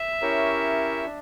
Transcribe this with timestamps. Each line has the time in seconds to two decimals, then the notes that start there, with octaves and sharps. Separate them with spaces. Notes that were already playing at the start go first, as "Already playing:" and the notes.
Already playing: E5
0.22 C#4 E4 G4 A#4 C#5
1.05 D4